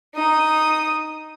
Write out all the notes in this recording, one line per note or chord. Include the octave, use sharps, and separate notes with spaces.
D#4 D#6